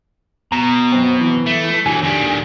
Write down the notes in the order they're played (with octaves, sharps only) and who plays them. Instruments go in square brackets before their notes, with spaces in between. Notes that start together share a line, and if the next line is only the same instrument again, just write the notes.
[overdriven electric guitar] B2 [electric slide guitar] A#5
[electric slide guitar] F#2 C4
E3
[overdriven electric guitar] A3
[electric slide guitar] D3 G#5 [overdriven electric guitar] E3 F#3
[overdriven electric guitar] D#3 G3